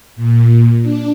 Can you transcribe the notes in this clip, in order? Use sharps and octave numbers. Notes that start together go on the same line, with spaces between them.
A#2
D4